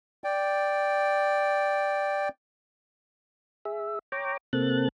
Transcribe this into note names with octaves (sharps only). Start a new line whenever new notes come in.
D5 G5
G#4 E5
C#5 G5 A#5 D6
C3 A#3 C4 A4 F#6 A6